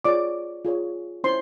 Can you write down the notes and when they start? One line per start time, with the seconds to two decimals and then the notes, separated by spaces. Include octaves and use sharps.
0.04 F4 G#4 C#5 D5 D6
0.65 F4 G#4 C#5
1.24 C#4 E4 C5 C6